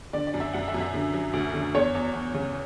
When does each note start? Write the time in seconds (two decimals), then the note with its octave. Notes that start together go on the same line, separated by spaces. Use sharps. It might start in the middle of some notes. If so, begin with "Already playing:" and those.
0.13 D3 D5
0.27 D5
0.34 F#2
0.40 E5
0.53 F#2 F#5
0.68 E5
0.74 F#2
0.80 E5
0.94 D3
1.14 F#3
1.33 D2
1.54 D3
1.74 E2 C#5
1.95 E2
2.14 E2
2.34 C#3